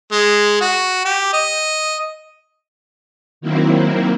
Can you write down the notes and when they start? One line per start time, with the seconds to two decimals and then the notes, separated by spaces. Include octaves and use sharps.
0.12 G#3
0.61 F#4
1.05 G4
1.33 D#5
3.41 D#3 F#3 A#3 C4 E4